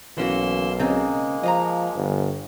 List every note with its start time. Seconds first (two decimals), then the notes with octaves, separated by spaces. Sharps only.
0.18 B1 E3 A#3 C#4 F#4 C6 E6
0.80 C#3 G#3 A#3 C4 D#4
1.44 F3 D#5 F5 A#5
1.96 G1